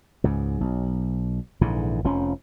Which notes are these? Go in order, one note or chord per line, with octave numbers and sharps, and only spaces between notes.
C#2 G#2
B1
A#1 G#2 D3 E3
F1 F2 F3 C#4